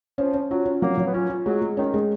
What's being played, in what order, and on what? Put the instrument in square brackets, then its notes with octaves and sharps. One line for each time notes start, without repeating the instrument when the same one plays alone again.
[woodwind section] F3 [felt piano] C#4
[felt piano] C#4
[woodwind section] F#3 [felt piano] F4
[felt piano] C#4
[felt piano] F#3 [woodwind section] A#3
[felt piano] F#3
[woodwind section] B3
[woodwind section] C#4 [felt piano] F4
[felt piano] F4
[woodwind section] F#3 [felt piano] G#3
[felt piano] G#3
[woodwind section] D#3 [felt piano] C#4
[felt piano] G#3